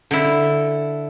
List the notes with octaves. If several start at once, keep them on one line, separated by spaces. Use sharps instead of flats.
D3 E4